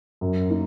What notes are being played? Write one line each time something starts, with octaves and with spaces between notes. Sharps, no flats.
F#2
A#3 D#4